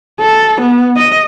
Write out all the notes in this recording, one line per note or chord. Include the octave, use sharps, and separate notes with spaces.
A4
B3
D#5